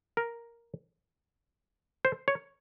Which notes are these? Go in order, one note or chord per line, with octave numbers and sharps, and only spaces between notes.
A#4
C5
C#5